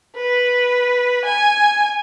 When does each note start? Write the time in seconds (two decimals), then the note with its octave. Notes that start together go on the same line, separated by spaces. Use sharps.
0.16 B4
1.25 G#5